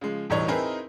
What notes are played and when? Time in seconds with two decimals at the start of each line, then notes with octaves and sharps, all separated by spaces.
0.01 C#3 F3 G#3
0.30 E1 E2 A2 G3 D#4 C#5
0.48 C4 D#4 E4 G#4 A#4 B4